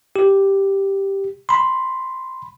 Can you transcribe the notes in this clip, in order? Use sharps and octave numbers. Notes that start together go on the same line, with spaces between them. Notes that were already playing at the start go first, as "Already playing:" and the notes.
G4
B5 C6